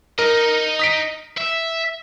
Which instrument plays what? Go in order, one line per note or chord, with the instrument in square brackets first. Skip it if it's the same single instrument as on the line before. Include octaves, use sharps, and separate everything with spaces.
[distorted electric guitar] D#4 D#5 [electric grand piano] A#4
[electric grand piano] D#6 B6 D7
[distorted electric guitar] E5